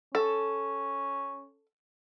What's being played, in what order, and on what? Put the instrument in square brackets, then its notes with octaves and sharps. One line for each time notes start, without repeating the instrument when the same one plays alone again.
[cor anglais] C#4 [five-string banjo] A4